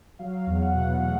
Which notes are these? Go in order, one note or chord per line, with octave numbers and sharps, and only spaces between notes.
F#3 F5
E2
F#5
B2
A3 F#5